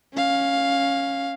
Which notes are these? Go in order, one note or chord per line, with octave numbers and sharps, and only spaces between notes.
C#4 F5